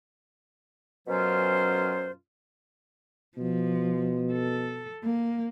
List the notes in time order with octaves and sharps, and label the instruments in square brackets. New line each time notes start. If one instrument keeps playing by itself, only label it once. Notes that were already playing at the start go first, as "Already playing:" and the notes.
[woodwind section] F#2 B2 F#3 C#4 F4 C5
[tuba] B2 [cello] F3
[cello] A4
A#3